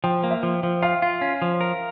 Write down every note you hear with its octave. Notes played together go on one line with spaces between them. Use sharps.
F3 G5
A#3
E5
F3
F3
F4 F5
F4
C#4
F3
A#4